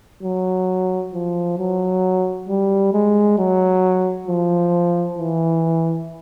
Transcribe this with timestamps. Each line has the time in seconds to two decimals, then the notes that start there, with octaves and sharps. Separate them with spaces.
0.22 F#3
1.13 F3
1.58 F#3
2.49 G3
2.93 G#3
3.38 F#3
4.28 F3
5.18 E3